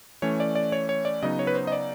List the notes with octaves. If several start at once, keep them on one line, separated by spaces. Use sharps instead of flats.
E3 A3 C#4 C#5
D5
D5
C#5
C#5
D5
C#3 F#3 B3 D#4 D#5
C#5
B4
C5
D#5
D5